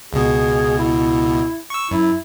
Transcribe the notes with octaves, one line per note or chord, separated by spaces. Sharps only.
C#2 B2 G#4
E4
C#6 E6
F#2 E4